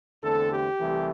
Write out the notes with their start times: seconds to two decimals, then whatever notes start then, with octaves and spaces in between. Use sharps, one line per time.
0.23 E2 D3 A3 C4 A4
0.51 G4
0.79 C2 C3 E3 A3